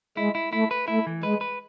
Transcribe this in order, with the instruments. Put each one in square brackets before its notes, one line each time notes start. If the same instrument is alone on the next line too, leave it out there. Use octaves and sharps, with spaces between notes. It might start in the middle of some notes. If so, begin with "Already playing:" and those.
[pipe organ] G#3 [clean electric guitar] E4
[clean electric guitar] E4
[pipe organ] A3 [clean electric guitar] E4
[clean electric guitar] B4
[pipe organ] A3 [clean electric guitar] E4
[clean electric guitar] E3
[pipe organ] G#3 [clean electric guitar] B4
[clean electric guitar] B4